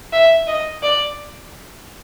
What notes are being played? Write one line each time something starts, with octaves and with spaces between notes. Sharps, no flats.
E5
D#5
D5